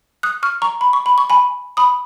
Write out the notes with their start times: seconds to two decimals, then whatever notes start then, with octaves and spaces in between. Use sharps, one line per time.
0.23 D#6 F#6
0.43 C#6 F6
0.62 A#5 C#6
0.81 B5
0.93 C#6
1.06 B5
1.18 C#6
1.30 G#5 B5
1.77 B5 D#6